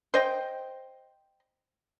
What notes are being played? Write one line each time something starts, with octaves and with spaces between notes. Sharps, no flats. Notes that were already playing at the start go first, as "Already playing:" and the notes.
C5 D#5 G5